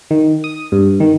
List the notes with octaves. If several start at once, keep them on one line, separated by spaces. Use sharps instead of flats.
D#3
D#6
G2
D#3